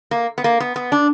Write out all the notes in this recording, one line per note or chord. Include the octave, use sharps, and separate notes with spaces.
A#3
B3
A#3
B3
B3
D4